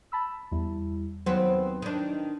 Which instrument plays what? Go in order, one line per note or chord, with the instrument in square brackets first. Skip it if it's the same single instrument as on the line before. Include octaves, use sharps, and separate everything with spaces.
[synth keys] A5 B5 E6
E2 G3 E4
[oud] D#2 B3 C4 [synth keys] F#3
[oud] D#3 D4